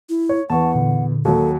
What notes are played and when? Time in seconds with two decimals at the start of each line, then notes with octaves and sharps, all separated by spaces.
0.09 E4
0.29 C#5
0.50 E2 E3 F#5 A5 C#6
0.75 A#2 D3
1.25 D#2 F#3 A4